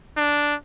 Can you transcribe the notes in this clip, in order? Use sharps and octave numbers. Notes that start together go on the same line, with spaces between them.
D4